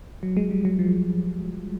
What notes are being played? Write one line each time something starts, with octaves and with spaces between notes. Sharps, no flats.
F#3
G#3
G3
F#3
F3